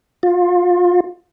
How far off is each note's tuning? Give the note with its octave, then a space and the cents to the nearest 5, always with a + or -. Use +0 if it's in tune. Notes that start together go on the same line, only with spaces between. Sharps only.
F4 +25